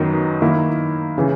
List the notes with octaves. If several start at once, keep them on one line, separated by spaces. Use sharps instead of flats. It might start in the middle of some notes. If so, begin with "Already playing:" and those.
Already playing: F#2 D#3 F#3 B3 D#4
D#3 A#3 E4
C#3 E3